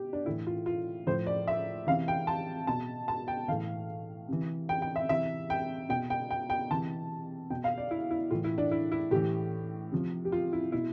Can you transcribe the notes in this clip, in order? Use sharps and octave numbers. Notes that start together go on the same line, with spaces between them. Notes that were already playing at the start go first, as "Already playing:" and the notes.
Already playing: B2 G4
D4
A2 E3 E4
F4
F4
A2 F3 C5
D5
E5
C3 E3 F5
G5
A5
B2 A5
A5
G5
A2 E3 F5
C3 E3
G5
G5
E5
C3 E3 E5
G5
B2 G5
G5
G5
G5
C3 E3 A5
B2 G5
F5
D5
E4
E4
A2 E3 F4
E4
D4
E4
E4
A2 E3 G4
C3 F3
G4
F4
E4
B2 E4